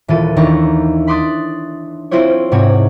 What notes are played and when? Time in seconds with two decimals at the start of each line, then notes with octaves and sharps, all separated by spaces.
0.08 D#1 E3 F4 A4 D#7
0.36 D#2 D#3 E3 D4 A#5 C#6
1.07 B5 C6 D6 D#6 F#6 A6
2.11 C4 E4 F4 C5 C#5
2.52 G#2 C3 C4 C#5 F#5 G#5